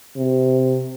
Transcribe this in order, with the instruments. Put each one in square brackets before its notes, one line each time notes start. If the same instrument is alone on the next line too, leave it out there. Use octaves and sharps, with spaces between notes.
[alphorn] C3